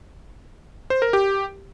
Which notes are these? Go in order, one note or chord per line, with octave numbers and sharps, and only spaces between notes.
C5
A#4
G4